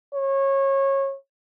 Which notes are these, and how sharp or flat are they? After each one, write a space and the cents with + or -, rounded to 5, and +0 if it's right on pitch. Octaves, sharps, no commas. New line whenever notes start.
C#5 -25